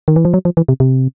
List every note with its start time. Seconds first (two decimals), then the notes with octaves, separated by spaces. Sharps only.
0.08 D#3
0.16 E3
0.25 F3
0.34 F#3
0.45 F3
0.57 E3
0.69 C3
0.80 C3